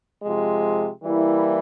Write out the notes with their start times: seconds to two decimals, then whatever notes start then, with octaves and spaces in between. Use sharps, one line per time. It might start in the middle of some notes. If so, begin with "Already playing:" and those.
0.23 C3 F3 G#3
1.04 E3 G3 A#3 E4